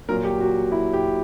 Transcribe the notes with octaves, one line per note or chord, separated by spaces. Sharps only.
A#2 F#3 A#3 A#4
G4
F#4
E4
G4